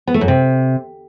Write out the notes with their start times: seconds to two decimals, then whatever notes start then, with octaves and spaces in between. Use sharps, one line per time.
0.07 B3
0.14 A3
0.21 F#2
0.28 C3